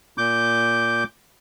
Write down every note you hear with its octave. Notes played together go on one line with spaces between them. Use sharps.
A#2 D6 G6